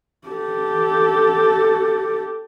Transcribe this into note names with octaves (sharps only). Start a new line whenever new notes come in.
G4 A4